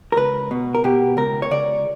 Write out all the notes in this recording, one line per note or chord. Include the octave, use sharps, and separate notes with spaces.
A#4
C#2 B4
B2
A#4
B2 G4
C#2 A#4
C#5
C#2 D5